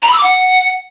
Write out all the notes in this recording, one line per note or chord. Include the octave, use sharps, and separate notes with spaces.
A#5
B5
E6
D6
F#5